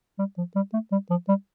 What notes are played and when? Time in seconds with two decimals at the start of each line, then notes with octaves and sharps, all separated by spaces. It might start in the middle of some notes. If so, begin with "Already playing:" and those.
0.19 G3
0.38 F3
0.56 G3
0.73 A3
0.92 G3
1.10 F3
1.28 G3